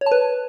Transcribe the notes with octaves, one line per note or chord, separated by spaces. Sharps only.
C#5
A5
B4